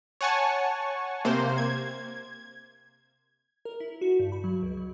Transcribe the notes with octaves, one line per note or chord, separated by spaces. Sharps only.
C#5 F#5 G#5 A5 C#6
C3 A#3 C5
G#6
A#4
E4
F#4
G2
B5
F#3
C#2
F#3